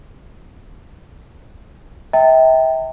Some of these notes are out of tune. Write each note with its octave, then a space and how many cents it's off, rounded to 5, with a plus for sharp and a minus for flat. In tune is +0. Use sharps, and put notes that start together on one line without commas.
E5 -35 G5 +0 A#5 -35